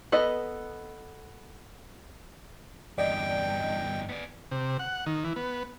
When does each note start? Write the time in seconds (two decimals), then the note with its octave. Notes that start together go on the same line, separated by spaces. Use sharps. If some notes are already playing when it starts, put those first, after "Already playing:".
0.12 B3 A4 B4 D#5
2.98 E2 G2 D5 D#5 G5
4.09 B3 D5
4.51 C3
4.79 F#5
5.06 D#3
5.24 E3
5.36 B3